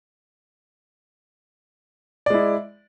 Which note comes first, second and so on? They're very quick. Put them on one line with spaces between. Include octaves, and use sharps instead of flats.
D5 G#3 E4